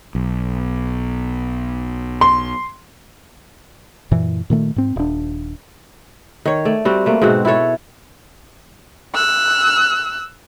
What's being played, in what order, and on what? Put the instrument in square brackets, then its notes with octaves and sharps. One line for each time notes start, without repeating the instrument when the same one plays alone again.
[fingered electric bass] B1
[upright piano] C6
[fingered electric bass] F#2 A#2 E3
A#2 D#3 A3
G#2 C4
D#1 D4
[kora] D#3 C#5
A3 D5
G3 C4 F#4
A3 A#3 B4
G#2 B2 C4 F#4
E4 F#4 A4 C#5
[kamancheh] E6 F#6